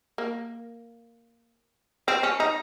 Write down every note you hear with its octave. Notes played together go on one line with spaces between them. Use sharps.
A#3
C4
C#4
D#4